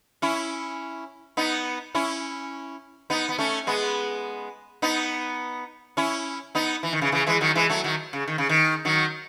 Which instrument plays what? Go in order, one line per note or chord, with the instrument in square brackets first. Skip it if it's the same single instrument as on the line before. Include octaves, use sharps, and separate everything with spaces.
[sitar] C#4 E4
B3 D#4
C#4 E4
B3 D#4
B3
A3 C#4
G#3 B3
B3 D#4
C#4 E4
B3 D#4
E3
D#3
C#3 E3
C#3 E3
E3 G#3
D#3 F#3
E3 G#3
F#3 A3
D#3 F#3
C#3
D#3
C#3
D#3
D#3 F#3